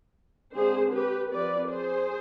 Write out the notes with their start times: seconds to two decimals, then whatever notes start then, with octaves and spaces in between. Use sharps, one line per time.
0.55 D3 G#3 C4 G#4 C5
0.93 G4 B4
1.32 F3 C4 B4 D5
1.71 G#4 C5